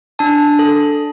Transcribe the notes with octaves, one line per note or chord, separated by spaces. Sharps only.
D4 A5
A4